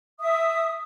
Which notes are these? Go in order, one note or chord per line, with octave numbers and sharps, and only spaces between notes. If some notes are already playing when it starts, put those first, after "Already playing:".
E5 D#6